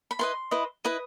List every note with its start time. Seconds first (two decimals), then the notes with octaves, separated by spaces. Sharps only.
0.11 B5
0.19 E4 B4 D#5 C6
0.51 E4 B4 D#5
0.84 E4 B4 D#5 D#6